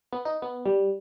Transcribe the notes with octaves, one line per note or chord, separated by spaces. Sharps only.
B3
D#4
B3
G3